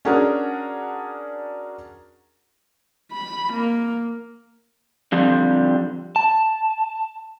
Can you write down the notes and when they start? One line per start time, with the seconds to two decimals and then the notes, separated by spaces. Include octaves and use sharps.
0.05 C#4 D4 F#4 G#4 A#4
3.12 B5
3.53 A#3
5.12 D3 F3 G3 C4
6.16 A5